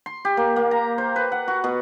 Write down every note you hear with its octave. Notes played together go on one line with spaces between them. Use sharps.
C6
G4
A#3
A#3
A#5
C5
B4
F#5
F#4
B2